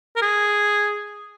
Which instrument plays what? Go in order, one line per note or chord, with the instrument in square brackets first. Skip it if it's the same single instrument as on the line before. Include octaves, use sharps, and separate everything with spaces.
[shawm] A#4
G#4